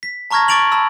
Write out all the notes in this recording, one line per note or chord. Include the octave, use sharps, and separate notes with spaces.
B6
A5 A#5 C#6 F6 G#6 A#6
C#6 D6 A6 D7 F7 F#7
A5 B5 E6